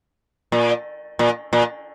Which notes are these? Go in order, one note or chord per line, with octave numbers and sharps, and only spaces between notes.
A#2
A#2
A#2